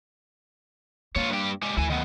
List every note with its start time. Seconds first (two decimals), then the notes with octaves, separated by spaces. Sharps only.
1.16 A#3 F4 C#5
1.30 G2 G4
1.62 G#3 G4
1.77 D2 E4 G#5
1.90 D#3 B3